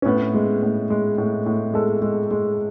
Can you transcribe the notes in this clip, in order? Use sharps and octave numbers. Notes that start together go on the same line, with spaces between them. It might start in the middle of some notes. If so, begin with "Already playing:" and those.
C#4
A2 B3
G#3
A2
G#3
A2
A2
G#3 A4
G#3
G#3